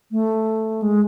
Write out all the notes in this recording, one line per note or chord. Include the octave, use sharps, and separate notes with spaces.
A3
G#3